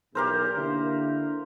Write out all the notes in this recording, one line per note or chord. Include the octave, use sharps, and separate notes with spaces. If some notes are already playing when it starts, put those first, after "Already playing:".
B1 E2 G4 A#4 C5
D3 A#3 E4